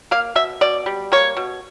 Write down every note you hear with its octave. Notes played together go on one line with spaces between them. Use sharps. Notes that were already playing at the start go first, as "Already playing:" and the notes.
A#3 F5
B2 E5
B2 D5
G3
A#3 C#5
B2